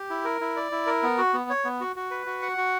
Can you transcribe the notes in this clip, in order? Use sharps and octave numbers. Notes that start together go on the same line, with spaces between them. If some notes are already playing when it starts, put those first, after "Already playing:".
Already playing: G4
E4
A#4
E4
D5
E4
A#4
B3
F#4
B3
C#5
B3
F#4
F#4
B4
F#4
F#5
F#4